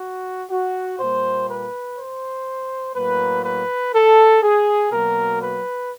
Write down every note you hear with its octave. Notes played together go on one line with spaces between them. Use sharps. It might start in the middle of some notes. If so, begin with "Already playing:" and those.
Already playing: F#4
F#4
A#2 G3 A#3 C5
B4
C5
A2 F#3 A#3 B4
B4
A4
G#4
B2 F#3 A#3 A#4
B4